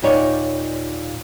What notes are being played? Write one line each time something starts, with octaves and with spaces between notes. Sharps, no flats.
D#2 A#2 D#4 C#5 D5